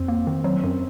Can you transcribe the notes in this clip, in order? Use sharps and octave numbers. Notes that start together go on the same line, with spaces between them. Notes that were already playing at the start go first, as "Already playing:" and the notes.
Already playing: F2 C4
A#3
D#3
F#3 C4
F#2